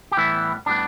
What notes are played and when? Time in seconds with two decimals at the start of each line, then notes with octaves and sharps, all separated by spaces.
0.12 G4
0.17 A2 E3 G3 B3 E4
0.66 A2 G3 B3 D4